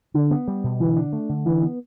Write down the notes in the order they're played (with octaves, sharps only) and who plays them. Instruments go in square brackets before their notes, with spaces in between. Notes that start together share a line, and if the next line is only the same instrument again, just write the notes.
[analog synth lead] D3 [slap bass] D4
[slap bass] B3
G3
B2
[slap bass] D3 [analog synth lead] E3
[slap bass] D4
A3
D3
[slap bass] D3 [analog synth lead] E3
[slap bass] B3